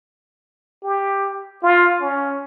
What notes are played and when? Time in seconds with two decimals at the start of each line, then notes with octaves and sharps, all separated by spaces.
0.83 G4
1.63 F4
2.01 C#4